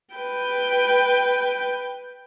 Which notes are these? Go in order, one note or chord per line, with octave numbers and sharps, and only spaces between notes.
B4 G5